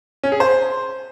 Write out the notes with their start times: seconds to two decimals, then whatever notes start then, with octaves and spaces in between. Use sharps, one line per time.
0.23 C#4
0.32 G#4
0.40 C5